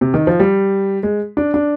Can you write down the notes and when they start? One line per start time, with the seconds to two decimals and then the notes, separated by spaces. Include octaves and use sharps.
0.01 C3
0.14 D#3
0.27 F3
0.40 G3
1.03 G#3
1.37 D4
1.54 D4